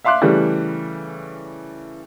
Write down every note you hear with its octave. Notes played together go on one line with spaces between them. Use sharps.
E5 F5 C6 D6 F#6
C#3 E3 G3 A3